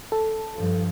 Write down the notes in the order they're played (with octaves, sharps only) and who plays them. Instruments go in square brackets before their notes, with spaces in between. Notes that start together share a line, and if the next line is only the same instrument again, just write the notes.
[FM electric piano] A4
[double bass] G2 F3